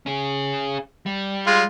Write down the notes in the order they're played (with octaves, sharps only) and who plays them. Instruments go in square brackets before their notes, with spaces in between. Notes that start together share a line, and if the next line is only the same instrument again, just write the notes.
[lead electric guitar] C#4 G#4
G3
[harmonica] G#3 F4